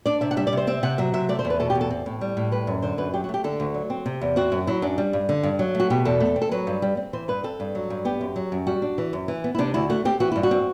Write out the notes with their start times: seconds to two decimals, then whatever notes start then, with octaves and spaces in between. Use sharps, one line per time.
0.06 D4 D5
0.21 C3 E5
0.31 F#5
0.37 G3 E5
0.47 D5
0.53 C3 C5
0.67 C4 E5
0.83 C3 F#5
0.98 F#3 E5
1.14 C3 E5
1.29 A3 D5
1.39 C5
1.45 E2
1.50 B4
1.60 B2 A4
1.70 G4
1.75 E2
1.81 A4
1.91 C4
2.06 A2
2.21 G3
2.37 A2
2.52 G3 B4
2.67 F#2
2.82 D3 C5
2.98 F#2 B4
3.13 F#3 G4
3.24 F#4
3.29 A3 G4
3.44 D3 A4
3.60 D2
3.74 F#3
3.90 C4
4.06 C3
4.21 E2
4.36 C4 F#4
4.52 F#2
4.67 F#3 E4
4.82 F#2 D4
4.98 G3
5.13 G2
5.29 D3
5.43 G2
5.59 F#3
5.75 A3
5.80 F#4
5.90 B2 G4
6.05 E2 A4
6.20 A3
6.36 C4
6.42 A4
6.51 F#3 B4
6.67 G2
6.82 G3
6.97 C4
7.13 E3 C5
7.28 G2 B4
7.44 C4 A4
7.60 G2
7.75 F#3
7.90 G2
8.05 B3 G4
8.21 F#2
8.36 F#3
8.52 F#2
8.67 G3 F#4
8.82 D4
8.98 E3
9.13 F#2
9.28 E3
9.44 B3
9.55 E4
9.58 C3 D4
9.74 D2 E4
9.90 A3 F#4
10.05 C4 G4
10.20 E3 F#4
10.32 G2 E4
10.43 F#4
10.51 C4